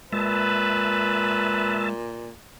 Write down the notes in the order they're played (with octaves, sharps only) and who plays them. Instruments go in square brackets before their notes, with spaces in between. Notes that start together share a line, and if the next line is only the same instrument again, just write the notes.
[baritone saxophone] A#2 [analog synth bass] G#3 [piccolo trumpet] B4 [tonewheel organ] E5 A5